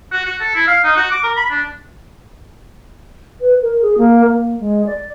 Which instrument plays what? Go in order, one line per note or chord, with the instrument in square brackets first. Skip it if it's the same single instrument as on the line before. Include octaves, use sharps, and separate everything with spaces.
[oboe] F#4
F#4
A4
E4
F5
D#4
F#4
D6
A#4
B5
D4
[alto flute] B4
A#4
G#4
A#3
A#3
G#3
D5